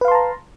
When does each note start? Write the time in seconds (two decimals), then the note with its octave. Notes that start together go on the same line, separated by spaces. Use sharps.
0.01 B4
0.05 F5
0.08 C6
0.11 A5
0.15 A#5